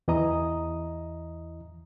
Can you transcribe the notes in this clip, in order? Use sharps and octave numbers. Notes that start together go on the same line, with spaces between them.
E2 E3 E4 D#5 A#5 D#6